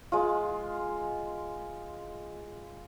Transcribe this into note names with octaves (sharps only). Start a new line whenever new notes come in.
G#3 F4